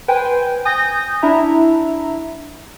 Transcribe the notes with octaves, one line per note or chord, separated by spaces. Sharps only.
B4 C5 G5 G#5
G#5 D#6 G6 A#6
D4 E4 E5 A#5